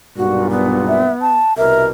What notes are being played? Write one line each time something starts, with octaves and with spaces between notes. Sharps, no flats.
B1 G2 A#2 F#4
B3
E5
A5
C2 B2 A#4 E5